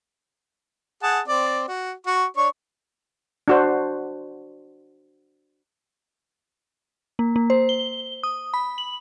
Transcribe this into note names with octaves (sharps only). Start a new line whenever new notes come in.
G#4 F#5 A5
C4 D5
F#4
F#4 C#6
D4 C#5 C#6
D4 F#4 C5
A#3
A#3
C5
G7
D#6
B5
F#7